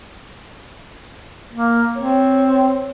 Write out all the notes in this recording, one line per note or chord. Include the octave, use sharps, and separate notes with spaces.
A#3
C4 C#5